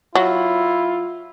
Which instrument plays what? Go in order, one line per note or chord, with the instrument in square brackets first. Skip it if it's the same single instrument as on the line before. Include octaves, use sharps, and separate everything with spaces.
[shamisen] F#3 [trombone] E4 [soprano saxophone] F4